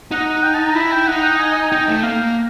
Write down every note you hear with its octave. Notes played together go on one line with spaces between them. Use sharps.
D#4 F#5
G5
A5
A#5
E4 B5
G5
D#4 F#5
G5
G#5
D#4 G5
A3
A#3 F5